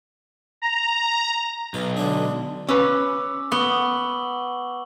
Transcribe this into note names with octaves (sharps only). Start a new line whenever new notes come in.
A#5
B1 B4
D3 G#3 D4 G#4
C#4 B4 D6 E6
B3 C#6 F#7 G7